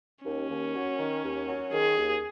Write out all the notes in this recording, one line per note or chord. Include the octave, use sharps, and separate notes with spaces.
D#2 C#4
D#2
F#3
D#3
D#2
F#3
D#3 G#4
D#2